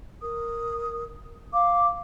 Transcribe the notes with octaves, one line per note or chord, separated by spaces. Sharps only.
A#4 D#6
F5 D6